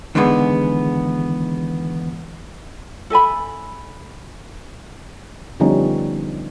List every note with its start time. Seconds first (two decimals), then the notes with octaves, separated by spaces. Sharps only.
0.15 E2 D3 D#3 G#3 B3
3.10 A4 E5 G#5 B5
5.60 D3 F3 G3 B3 C#4 D#4